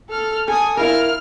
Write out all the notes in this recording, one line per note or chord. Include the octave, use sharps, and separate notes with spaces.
A4 F6
A4 G#5 D#6
E4 F4 A#4 F6